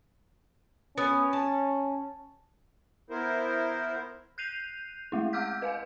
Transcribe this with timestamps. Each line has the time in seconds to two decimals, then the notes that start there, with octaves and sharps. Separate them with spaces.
0.98 B3 C#4
1.33 A5
3.10 B3 E4 A#4 C5
4.38 F#6 G6 C7 D#7 F7
5.12 G#3 A3 E4
5.33 F#5 D6 E6 F6 G6 B6
5.62 B4 F5 G#5